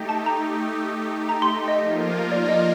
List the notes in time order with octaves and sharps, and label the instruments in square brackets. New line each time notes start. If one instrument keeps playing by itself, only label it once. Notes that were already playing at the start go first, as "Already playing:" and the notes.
Already playing: [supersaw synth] A3 D#4 G4
[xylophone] A5
A#5
A#5
C6
D#5
[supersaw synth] F3 A#3 F4 A#4
[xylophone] D5
D#5